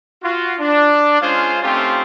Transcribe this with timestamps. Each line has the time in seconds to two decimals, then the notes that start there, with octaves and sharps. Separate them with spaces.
0.22 F4 F#4
0.59 D4
1.20 G#3 C#4 F4 G#4 C5 F5
1.62 A3 C4 C#4 D#4 F4 G4